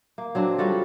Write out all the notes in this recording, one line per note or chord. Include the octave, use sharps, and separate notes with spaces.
A#3
F#3 C4 D4
G3 F4 F#4 A4